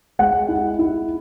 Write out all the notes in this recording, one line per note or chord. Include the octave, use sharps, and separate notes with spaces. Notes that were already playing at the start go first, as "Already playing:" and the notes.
G#3 F#5
E4
E4